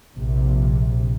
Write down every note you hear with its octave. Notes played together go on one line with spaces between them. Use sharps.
A#1 C3